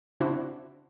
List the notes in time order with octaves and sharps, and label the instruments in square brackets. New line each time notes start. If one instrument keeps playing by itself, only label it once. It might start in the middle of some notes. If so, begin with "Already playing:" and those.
[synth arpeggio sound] C#3 C4 D4 E4 F#4